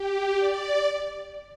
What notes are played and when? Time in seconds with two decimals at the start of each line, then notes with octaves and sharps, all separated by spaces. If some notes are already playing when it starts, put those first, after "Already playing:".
Already playing: G4
0.37 D5